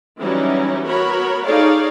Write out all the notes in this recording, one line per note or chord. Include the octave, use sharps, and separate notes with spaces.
E3 F#3 G3 C#4 D#4 E4
B3 F#4 A#4 C#5 B5
D#4 G#4 A4 C#5 D5 F5